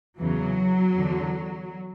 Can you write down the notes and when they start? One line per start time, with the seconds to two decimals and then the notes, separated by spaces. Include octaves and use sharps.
0.20 E2 C#3 E3 F#3
0.96 E2 D3